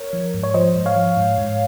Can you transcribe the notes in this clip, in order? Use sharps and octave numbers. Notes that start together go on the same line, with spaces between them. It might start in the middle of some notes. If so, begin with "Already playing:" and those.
Already playing: A#4 C#5
F3
G#2
C#5
F3 C5 D#5
G#2
C#5 F5
F3
G#2
G#2